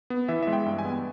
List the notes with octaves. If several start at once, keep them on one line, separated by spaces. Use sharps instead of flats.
B3
E3 E5
G#3 E5
G5
G2
G#5
B3